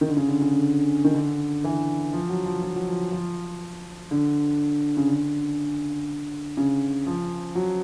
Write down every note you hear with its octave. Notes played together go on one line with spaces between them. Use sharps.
D#3
D3
C#3
D3
C#3
D3
D#3
D3
E3
F3
F#3
F3
F3
F#3
F3
F3
D3
C#3
D3
C#3
F3
F#3